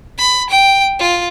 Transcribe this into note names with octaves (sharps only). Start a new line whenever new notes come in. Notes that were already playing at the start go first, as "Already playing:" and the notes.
B5
G5
F4